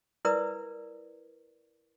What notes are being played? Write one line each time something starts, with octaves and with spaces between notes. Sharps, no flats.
E4 A#4 B4 D5 D#6